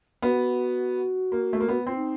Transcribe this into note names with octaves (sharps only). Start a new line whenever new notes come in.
B3 F#4
A#3
A3
A#3
B3 F#4
C4 F4
D#4